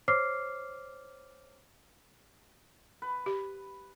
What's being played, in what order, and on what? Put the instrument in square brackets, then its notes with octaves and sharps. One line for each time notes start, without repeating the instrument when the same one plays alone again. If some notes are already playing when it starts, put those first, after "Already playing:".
[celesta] C5 C#5 D6 F6 C7
[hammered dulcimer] B4
[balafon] G4